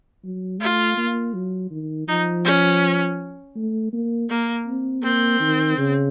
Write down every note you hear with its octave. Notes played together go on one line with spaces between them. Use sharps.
F#3
A3 F4
A#3
F#3
D#3
F3 D#4
C#4
A3
A#3
A#3
C4
A#3 C4
D#3
C#3